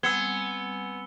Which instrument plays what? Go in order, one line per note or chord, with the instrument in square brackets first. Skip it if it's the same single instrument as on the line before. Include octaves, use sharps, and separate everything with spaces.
[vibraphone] G3 C4 G#5 [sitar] B3 [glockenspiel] E6 C#7 G7 [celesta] G#6